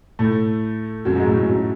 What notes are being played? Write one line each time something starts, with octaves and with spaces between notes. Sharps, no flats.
A2 A3
F#2 F#3
G#2 G#3
A2 A3
G#3
F#2 F#3